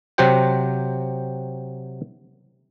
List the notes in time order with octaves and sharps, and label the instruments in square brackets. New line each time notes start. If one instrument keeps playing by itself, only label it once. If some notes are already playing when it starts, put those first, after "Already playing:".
[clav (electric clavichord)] C3 F#3 G4 C5 F#5 G5